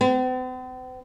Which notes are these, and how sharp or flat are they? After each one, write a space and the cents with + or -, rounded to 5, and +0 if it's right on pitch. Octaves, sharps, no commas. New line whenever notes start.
C4 -45